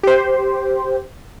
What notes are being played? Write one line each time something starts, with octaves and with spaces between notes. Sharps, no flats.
G4 C5